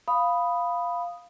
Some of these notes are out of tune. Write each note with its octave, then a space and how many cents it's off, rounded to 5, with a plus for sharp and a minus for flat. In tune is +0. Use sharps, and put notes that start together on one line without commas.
F5 +0 B5 +0 D#6 +0